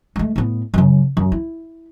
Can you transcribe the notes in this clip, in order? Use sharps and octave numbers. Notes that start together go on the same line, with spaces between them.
G#3 A3
A2 B3
F#2 C#3
F#2
E4